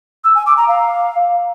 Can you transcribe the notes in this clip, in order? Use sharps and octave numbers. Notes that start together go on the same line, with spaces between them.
E6
G#5
D6
A#5
F5